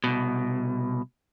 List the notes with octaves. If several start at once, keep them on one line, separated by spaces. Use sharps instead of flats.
C2 B2